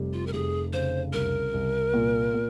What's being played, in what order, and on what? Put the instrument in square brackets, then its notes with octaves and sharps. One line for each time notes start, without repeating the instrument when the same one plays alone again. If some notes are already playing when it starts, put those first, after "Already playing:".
Already playing: [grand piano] F1 G3
[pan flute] F4
A#4
[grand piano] F1 [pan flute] G#4
[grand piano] C#3 [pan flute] C5
[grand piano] C2 [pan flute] A#4
[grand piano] C2
A#2
A#2